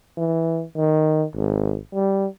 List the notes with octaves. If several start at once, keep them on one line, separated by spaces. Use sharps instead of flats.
E3
D#3
G#1
G3